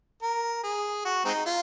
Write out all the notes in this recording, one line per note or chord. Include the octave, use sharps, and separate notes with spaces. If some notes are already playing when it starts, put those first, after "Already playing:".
A#4
G#4
F#4
G#3 C4 D#4
F4